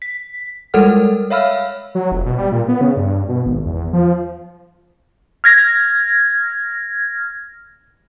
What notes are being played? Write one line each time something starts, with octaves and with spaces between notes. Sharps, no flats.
B6
G3 G#3 A4 A#4 F#5 F6
C#5 E5 F5 B5 E6 F6
F#3
F1
B2
G3
A#2
B3
C#3
G2
B2
G#1
E2
F3
F6 G#6 A#6